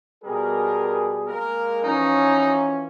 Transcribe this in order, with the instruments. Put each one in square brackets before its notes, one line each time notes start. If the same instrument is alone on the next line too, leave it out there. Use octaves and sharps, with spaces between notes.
[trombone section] B2 G3 G#4 [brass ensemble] A#4
[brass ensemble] G#3 A#3 A#4
[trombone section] E3 F3 [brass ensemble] C#4 [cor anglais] D#4